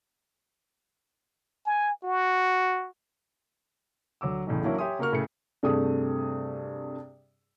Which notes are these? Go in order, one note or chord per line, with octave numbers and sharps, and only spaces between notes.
G#5
F#4
D2 F#3 D6 E6
B1 E2 A2 C#3
E3 F#3 A#3 C#4 D4 E4
G4 C#5 E5 G#5 C6 D#6
C#3 A#3 F#4 A#4 C#6 F6
A2 C#3 A3 G#4 C#7
G2 C3 A3 G#4 D#6